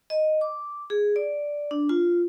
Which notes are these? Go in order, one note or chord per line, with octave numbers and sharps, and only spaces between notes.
D#5
D6
G#4
D5
D4
F4